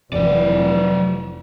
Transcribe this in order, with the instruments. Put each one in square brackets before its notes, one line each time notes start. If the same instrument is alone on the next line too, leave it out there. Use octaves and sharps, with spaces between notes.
[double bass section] F1 E3 [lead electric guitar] F#3 D5